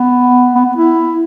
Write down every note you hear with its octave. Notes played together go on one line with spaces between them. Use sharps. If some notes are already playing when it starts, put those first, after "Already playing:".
Already playing: B3
B3
B3
E4